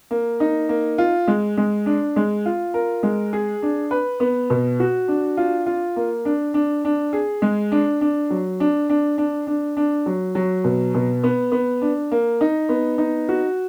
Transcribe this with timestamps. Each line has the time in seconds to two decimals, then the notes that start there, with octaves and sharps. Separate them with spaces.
0.11 A#3
0.40 D#4
0.69 A#3
0.98 F4
1.28 G#3
1.58 G#3
1.86 D4
2.16 G#3
2.46 F4
2.74 A#4
3.03 G#3
3.33 G#4
3.62 D4
3.91 B4
4.20 B3
4.50 B2
4.80 F#4
5.08 D4
5.37 F4
5.66 F4
5.96 A#3
6.25 D4
6.54 D4
6.85 D4
7.13 G#4
7.42 G#3
7.72 D4
8.01 D4
8.30 F#3
8.60 D4
8.90 D4
9.18 D4
9.47 D4
9.77 D4
10.06 F#3
10.35 F#3
10.64 B2
10.94 B2
11.23 B3
11.52 B3
11.82 D4
12.12 A#3
12.41 D#4
12.69 B3
12.98 D#4
13.29 F#4